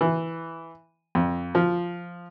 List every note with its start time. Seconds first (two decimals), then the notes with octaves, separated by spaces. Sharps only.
0.01 E3
1.15 F2
1.55 F3